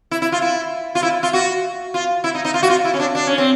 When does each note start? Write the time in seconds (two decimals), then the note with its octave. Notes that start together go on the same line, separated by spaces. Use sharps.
0.11 E4
0.22 E4
0.32 F4
0.42 E4
0.95 F4
1.03 E4
1.23 F4
1.33 F#4
1.94 F4
2.24 E4
2.35 D#4
2.45 D#4
2.54 F4
2.63 F#4
2.70 F4
2.85 E4
2.94 C#4
3.00 D4
3.15 D4
3.27 C#4
3.38 C4